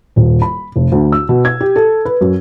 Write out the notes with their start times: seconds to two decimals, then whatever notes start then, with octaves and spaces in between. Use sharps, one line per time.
0.16 D#1
0.42 B5
0.76 F1
0.92 D2
1.12 E6
1.29 B2
1.45 G#6
1.61 G4
1.76 A4
2.05 B4
2.21 F#2